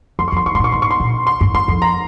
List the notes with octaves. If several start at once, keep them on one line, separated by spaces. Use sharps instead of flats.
F2 C6
C#6
F2
C6
G2 C#6
C3 C6
A#2
C#6
G#2 C6
C#6
C6
A#2
C6
G2
G2 C6
F2
A#5